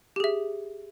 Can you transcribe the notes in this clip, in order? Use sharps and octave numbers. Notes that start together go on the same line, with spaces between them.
G4 G#4 E5